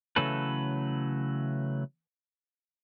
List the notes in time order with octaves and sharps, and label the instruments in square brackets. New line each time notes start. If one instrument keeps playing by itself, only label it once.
[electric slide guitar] C#3 E3 F#3 A3 A4 B4